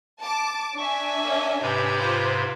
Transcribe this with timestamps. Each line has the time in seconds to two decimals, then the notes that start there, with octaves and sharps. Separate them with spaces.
0.21 A5 D6
0.78 D4 E5 G#5 C#6
1.23 A#3 C#4
1.61 G#2 C3 G4 B4
1.98 F4 C5